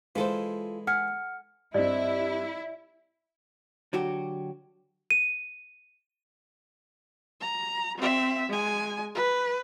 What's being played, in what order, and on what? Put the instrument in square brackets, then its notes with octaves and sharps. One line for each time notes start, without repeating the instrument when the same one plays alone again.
[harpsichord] E3 G#3 [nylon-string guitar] F4 A4 C5
[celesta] F#5 F6 C#7 [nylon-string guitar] G#5
[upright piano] G2 C4 [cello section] E4 [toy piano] D5 D#5
[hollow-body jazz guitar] D3 F#3 F#4 G4
[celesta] D#7
[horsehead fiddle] A#5
C4 E5
G#3 G#5
B4